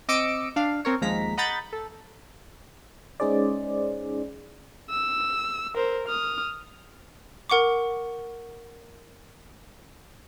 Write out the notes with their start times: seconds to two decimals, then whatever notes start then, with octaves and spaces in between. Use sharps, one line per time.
0.08 C4 D#5 D6 E6 C#7 D7
0.56 D4 F5
0.85 C4 A#4 C#5
1.01 D#2 F3 G#3 A#5 B6
1.37 D#5 F#5 A#5 B5 G6 A6
1.73 A4
3.20 G#3 C#4 D#4 G#4 C5 D5
4.90 E6
5.75 A#4 C5
6.08 D#6 F6
7.50 A#4 F#5 C#6 D6